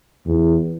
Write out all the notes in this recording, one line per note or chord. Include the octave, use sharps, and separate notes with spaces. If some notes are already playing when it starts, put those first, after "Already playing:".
E2